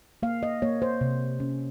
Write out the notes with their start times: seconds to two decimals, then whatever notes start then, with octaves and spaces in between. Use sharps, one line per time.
0.23 A#3 F5
0.43 D#5
0.62 A#3 C#5
0.82 C5
1.01 C3
1.40 C#4